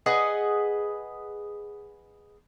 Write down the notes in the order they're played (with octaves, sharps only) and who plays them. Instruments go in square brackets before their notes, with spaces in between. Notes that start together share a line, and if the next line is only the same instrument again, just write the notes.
[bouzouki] G#4 B4 D#5 F#5